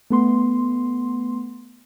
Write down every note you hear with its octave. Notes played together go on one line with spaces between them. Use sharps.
A3 B3 C6